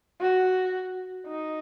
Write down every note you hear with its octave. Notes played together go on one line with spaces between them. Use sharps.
F#4
D#4